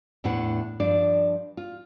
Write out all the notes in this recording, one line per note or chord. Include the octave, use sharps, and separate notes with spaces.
E2 A2 D4 E4 F#5
G2 F3 D4 D5
F4